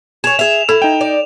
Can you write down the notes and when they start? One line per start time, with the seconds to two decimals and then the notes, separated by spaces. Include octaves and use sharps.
0.24 G#4 C#5 E7 F7
0.39 G#4 E5 F7
0.69 E4 A4
0.82 D#4 G5
1.01 D5